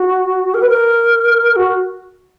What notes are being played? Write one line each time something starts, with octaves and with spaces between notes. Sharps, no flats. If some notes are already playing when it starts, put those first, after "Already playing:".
Already playing: F#4
A#4
B4
A#4
F#4